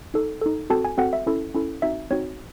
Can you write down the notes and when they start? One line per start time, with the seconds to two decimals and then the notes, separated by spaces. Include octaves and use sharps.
0.14 D#4 A4
0.41 D#4 A4
0.70 C4 F#4 A4 A5
0.85 G#5
0.98 C4 F#4 A4 F#5
1.13 E5
1.26 C#4 E4 A4
1.55 C#4 E4 A4
1.82 C4 D#4 F#4 E5
2.11 C4 D#4 F#4 C#5